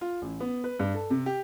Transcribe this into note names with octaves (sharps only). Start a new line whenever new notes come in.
F4
A1
B3
B4
G2
A4
C3
G4